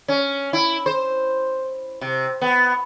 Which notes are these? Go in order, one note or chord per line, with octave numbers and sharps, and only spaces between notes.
C#4
E4
C5
C3
B3